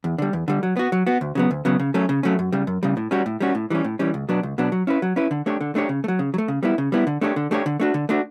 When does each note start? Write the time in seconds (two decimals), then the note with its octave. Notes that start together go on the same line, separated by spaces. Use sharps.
0.04 E2
0.18 D3 G3
0.33 E2
0.48 D3 G3
0.63 F#3
0.77 B3 F#4
0.92 F#3
1.07 B3 F#4
1.21 D2
1.35 C#3 F#3 B3
1.51 D2
1.65 C#3 F#3 B3
1.79 C#3
1.94 F#3 A3 C#4
2.09 C#3
2.23 F#3 A3 C#4
2.39 F#2
2.52 C#3 G3
2.67 F#2
2.83 C#3 G3
2.97 A2
3.11 G3 C#4 F#4
3.26 A2
3.40 G3 C#4 F#4
3.55 A2
3.70 E3 G3 C#4
3.84 A2
3.99 E3 G3 C#4
4.14 C#2
4.29 B2 F#3 B3 D4
4.43 C#2
4.58 B2 F#3 B3 D4
4.72 F#3
4.87 C#4 E4 B4
5.02 F#3
5.16 C#4 E4 B4
5.31 D3
5.46 A3 D4 G4 C#5
5.61 D3
5.75 A3 D4 G4 C#5
5.89 C#3
6.04 A3
6.08 F#3
6.19 C#3
6.34 F#3
6.38 A3
6.48 C#3
6.63 G3 B3 E4
6.78 C#3
6.92 G3 B3 E4
7.07 D3
7.21 A3 D4 G4 C#5
7.36 D3
7.51 A3 D4 G4 C#5
7.66 D3
7.80 A3 D4 F#4
7.94 D3
8.09 A3 D4 F#4